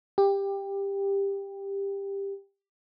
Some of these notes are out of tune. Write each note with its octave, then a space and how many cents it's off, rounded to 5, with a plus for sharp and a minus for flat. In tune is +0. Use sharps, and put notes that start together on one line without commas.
G4 +15